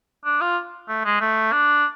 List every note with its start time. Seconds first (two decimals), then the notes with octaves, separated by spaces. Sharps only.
0.25 D4
0.41 F4
0.89 A3
1.05 G#3
1.21 A3
1.52 D4